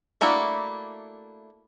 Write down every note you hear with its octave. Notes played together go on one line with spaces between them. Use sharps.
A3 A#3 D4 E4 F#4